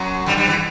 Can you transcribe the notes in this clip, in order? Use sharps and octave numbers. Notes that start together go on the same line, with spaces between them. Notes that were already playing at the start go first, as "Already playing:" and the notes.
Already playing: F#2 F#3
G2 G3
G2 G3
E3